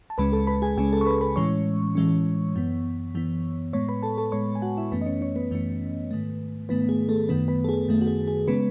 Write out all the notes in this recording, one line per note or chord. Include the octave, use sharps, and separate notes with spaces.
A5
C#2 C#3 G#3 C#4 B4 B5
A4 A5
B4 B5
G#4 G#5
C#2 C#3 G#3 C#4 G#4 G#5
A4 A5
C#6
B4 B5
B4 B5
A2 E3 G#3 C#4 C#5 C#6
A2 E3 G#3 C#4
F#2 E3 B3
F#2 E3 B3
A2 G#3 B3 C#5 C#6
B4 B5
A4 A5
A4 A5
A2 G#3 B3 C#5 C#6
G#5
F#4 F#5
E4 E5
F#2 E3 A3 B3 C#4 B4
D#5
C#4 C#5
C#4 C#5
B3 B4
F#2 E3 A3 C#4
G#2 D#3 A3
G#2 D#3 A3 B3 B4
G#4
A3 A4
F#2 D#3 A3 B3 B4
B3 B4
A4
G#4
F#2 D#3 A3
F#4
G#4
G#4
C#3 G#3 B3 C#4 B4